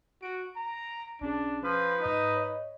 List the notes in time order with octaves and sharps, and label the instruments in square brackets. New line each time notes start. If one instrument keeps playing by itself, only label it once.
[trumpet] F#4 [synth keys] D7
[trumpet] A#5
[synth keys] B1 C#4 G#4 [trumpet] D4
[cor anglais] F3 [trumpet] B4
[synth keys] G#2 B6 [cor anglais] D#4
[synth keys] C#5 D#5